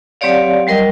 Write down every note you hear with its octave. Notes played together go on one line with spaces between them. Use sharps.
F#3 C4 G4 C#5 D5 F5
F#3 G3 A#4 D#5 G5